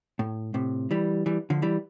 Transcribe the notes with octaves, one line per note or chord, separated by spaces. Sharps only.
A2
A2 C3
E3 G3
E3 G3
D3 F3
E3 G3